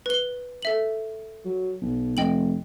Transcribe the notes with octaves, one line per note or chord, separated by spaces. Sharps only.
B4 G7
A4 E5 F#7
F#3
B1
F1 D#5 G5 F#7